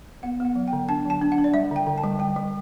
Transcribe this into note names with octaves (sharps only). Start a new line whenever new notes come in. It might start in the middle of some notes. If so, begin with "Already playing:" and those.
B3 F#5
B3 F#5
F#3
G5
D3
D4 A5
F#3 A5
D4
F#5
D4
D5
G3 E5
D3 G5
D3
A5
G3
G3 G5
G3